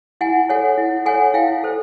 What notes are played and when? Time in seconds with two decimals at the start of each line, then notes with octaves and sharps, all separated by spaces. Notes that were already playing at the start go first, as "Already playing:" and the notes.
0.21 E4 F#5 G#5
0.49 A4 C#5 F#5 G#5
0.78 E4
1.06 A4 C#5 F#5 G#5
1.34 E4 F5 G5
1.64 A4 C5